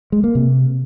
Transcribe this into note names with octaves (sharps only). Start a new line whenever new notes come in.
G#3
A#3
C3